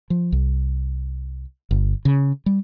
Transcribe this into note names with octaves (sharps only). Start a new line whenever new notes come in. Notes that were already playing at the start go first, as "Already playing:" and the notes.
F3
C2
G1
C#3
G3